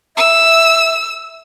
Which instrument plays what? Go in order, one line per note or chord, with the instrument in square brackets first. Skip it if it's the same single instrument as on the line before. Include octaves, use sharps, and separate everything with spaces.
[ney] E5 [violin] E6